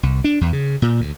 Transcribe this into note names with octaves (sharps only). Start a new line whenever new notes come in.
C2
D4
E2
C#3
A#2
D2